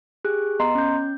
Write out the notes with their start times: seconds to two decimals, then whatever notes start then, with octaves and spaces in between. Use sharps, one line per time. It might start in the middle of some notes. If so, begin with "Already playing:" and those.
0.24 G4 G#4 F#6
0.59 B3 D#5 A#5 C6 C7
0.75 C#4 G6